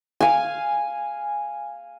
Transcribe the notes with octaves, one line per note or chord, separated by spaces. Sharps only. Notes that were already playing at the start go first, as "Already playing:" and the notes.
F5 G#5